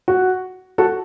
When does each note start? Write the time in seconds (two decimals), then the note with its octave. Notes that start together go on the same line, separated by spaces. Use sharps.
0.08 F#4
0.78 F#4 A4